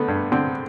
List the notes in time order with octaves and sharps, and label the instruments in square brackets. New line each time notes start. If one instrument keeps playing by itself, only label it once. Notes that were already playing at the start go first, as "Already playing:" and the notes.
Already playing: [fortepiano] D3 A3 B3
G2
D3 C4